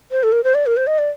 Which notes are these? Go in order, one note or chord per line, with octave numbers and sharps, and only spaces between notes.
C5
A4
A#4
C5
D5
A#4
C5
D#5
D5